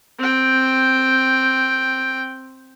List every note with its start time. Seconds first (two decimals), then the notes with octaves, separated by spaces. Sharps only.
0.19 C4 G5